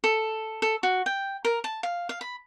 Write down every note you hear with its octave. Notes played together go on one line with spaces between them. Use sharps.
A4
A4
F#4
G5
A#4
A5
F5
F5
B5